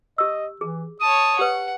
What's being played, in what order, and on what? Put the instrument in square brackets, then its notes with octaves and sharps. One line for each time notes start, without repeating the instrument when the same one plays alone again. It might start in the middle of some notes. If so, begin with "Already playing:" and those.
[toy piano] G4 E6 [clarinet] D#5
[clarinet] E3 [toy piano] G#4
[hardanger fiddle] C#5 A5 [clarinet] D#6
[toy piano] G4 B4 [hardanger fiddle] F#5